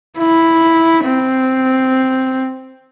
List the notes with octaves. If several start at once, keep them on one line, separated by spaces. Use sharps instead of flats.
E4
C4